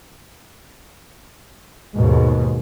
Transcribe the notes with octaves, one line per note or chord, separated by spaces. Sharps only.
D#2 G#2 B2